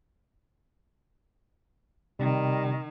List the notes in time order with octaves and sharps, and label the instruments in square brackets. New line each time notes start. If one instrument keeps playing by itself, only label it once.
[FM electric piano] C3 [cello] D#3 [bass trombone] G3